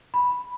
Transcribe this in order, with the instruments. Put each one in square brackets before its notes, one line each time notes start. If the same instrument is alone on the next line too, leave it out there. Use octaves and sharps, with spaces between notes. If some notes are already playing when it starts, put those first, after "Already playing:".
[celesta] B5